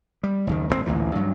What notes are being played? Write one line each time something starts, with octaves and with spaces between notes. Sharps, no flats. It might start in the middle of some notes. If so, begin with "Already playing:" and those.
G3
F#1 D#2 D#3
G#1 A2 C#3 C4
A1 D2 A#2 E3
G2 F#3